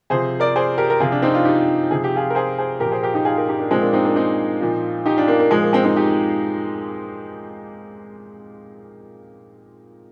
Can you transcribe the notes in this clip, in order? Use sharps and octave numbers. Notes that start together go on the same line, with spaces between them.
C3 F3 G#4 C5
A#4 D5
G#4 C5
G4 A#4
A#4
C3 F3 F4 G#4
D4 F4
C4 D#4
D4 F4
D#4 G4
C3 F3 G#4
G4
F4 G#4
A#4
G#4 C5
G#4 C5
A#2 F3 G4 A#4
G#4 C5
G4 A#4
D#4 G4
F4 G#4
G4 A#4
D#4 G4
A#3 D4
A#2 F3 G#3 C4
A#3 D4
C4 D#4
A#3 D4
C4 D#4
A#2 F3
D#4 G4
D4 F4
A#3 D4
A#3
A#2 F3 G#3
A#3
G#3 C4
C4 D#4
D#4 G4